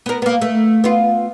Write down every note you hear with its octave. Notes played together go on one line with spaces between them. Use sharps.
B3 A#4
A#3 B3
A3
B3 F4